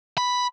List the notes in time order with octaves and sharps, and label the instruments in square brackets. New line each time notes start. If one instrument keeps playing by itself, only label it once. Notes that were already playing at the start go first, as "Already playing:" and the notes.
[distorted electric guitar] B5